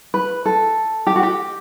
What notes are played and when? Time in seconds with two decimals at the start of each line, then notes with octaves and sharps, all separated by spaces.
0.14 B4
0.46 A4
1.07 G4
1.16 F#4
1.23 G4